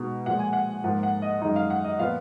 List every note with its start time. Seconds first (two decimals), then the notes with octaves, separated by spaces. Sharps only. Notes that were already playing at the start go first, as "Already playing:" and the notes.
Already playing: B2 G#3 B3 D#4
0.26 A#2 F3 G#3 F#5
0.39 G#5
0.53 F#5
0.84 G#2 F3 A#3 F#5
1.03 F#5
1.22 D#5
1.42 F#2 D#3 G#3 D#4 D#5
1.56 F5
1.70 F#5
1.84 D#5
1.99 A#2 F3 B3 F5